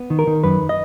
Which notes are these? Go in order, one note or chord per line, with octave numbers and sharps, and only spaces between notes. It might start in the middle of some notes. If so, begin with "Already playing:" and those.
Already playing: B3
D#3
A#4
D#3
F#2 B4
D#5